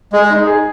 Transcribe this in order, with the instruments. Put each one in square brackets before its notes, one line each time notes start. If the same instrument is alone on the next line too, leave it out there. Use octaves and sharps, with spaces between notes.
[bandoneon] G#3 [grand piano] G#4
[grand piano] D#4
G#4